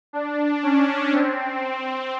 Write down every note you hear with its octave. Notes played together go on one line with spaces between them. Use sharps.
D4
C#4
C4